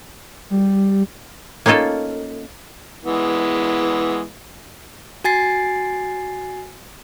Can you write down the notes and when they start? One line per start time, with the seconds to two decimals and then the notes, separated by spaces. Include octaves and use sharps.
0.50 G3
1.66 A#3 C#4 D#4 F4 A4
3.04 E3 G#3 B3
5.24 F#4 G#5 A6 C7